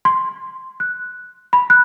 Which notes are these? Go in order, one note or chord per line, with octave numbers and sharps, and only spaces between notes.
C6
F#6
B5
F#6